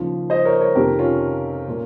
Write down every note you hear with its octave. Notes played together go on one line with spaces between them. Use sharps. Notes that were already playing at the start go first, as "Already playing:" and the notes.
Already playing: D#2 C#3 F3
C5 D#5
A#4 C#5
A#4 C#5
F2 C3 D#3 G4 A#4
C#4 F4
A#2